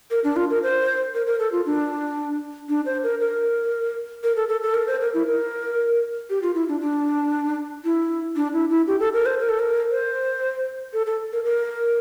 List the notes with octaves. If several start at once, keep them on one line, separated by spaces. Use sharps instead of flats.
A#4
D4
F4
A#4
C5
A#4
A#4
A4
F4
D4
D4
C5
A#4
A#4
A#4
A4
A4
A4
A#4
C5
A#4
E4
A#4
G4
F4
E4
D4
D4
E4
D4
E4
E4
G4
A4
A#4
C5
A#4
A4
A#4
C5
A4
A4
A#4
A#4